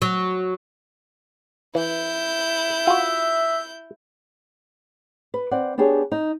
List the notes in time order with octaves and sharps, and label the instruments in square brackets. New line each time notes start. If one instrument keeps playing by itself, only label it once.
[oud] F#3
[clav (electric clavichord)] E3 [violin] E4 G6
[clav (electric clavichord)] F4 F#4 [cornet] E5
[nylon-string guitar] B4
C4 D5 F#5
B3 D4 G4 G#4 C#5
D#4